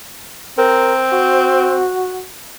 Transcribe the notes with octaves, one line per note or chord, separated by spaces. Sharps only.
C4 A#4
F#4